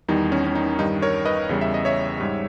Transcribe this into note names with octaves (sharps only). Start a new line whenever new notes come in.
E2 D#3 G3 D#4
C#4
C#4
D#4
G2 D#3 G3 D#4
A#4 C#5
B4 D#5
E2 C#3 G3
E5
D#5
C#5 E5
G#2 G3